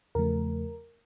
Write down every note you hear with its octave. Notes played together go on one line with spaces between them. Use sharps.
E2 C#3 F3 A3 A#4